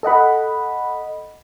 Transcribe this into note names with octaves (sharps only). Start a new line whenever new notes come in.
A4 D#5 F#5 B5